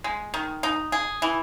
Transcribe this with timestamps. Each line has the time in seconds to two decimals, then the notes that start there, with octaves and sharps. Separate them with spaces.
0.04 G#3
0.34 D#3
0.63 D#4
0.92 G#4
1.22 E3